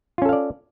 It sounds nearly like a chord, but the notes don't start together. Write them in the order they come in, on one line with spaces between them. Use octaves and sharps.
F4 C#4 A4 F5 D5